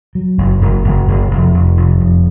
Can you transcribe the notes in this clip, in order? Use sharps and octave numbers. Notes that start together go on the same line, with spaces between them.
F#3
F#1
F#1
F#1
F#1
F1
F1
F1
F2